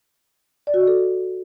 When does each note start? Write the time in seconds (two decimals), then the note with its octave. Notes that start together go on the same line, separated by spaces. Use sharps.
0.67 D5
0.74 F#4
0.81 D#5
0.87 A4